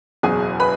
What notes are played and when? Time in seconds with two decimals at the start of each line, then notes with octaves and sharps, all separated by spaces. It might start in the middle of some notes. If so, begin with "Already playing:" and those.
0.23 F#1 E2 B2 F#3 G#4 G#5
0.60 B4 B5